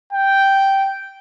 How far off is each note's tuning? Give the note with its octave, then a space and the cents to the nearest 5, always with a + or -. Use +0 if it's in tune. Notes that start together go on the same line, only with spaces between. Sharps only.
G5 -5